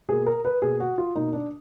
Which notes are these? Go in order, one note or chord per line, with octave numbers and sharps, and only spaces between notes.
B2 A#3 G#4
A#4
B4
B2 A#3 G#4
F#4
F4
B2 A#3 D#4
D4